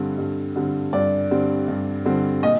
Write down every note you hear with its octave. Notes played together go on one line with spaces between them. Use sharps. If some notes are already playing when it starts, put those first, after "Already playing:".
Already playing: G2 D3 G3 C4
G2
D3 G3 C4
G2 D5
D3 G3 C4
G2
D3 G3 C4
A#2 D#5